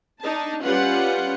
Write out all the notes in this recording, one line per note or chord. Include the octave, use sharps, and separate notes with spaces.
D4 D#4 A5
G3 C#4 F4 B4 F#5